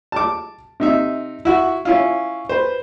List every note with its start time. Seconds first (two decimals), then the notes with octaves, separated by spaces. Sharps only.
0.12 A5 D6
0.80 C3 D#4 E5
1.45 E4 F#4
1.85 C#4 E4 F4
2.49 B4 C5